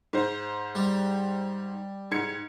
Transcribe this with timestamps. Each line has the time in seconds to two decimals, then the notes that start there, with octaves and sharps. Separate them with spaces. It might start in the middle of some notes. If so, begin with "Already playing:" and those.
0.13 G#2 C5
0.75 G3
2.11 G#2 G#6 C#7